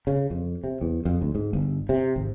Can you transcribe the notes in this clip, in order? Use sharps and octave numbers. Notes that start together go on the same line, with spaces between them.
C#3
F2
C3
E2
F2
D2
G#2
G1
C3
G#1